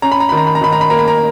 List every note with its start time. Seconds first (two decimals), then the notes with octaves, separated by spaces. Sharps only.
0.02 C#4 A#5
0.12 B5
0.20 A#5
0.29 D#3 B5
0.37 A#5
0.47 B5
0.55 A#5
0.61 D#3 B5
0.72 A#5
0.81 B5
0.90 A#3 A#5
0.99 B5
1.08 A#5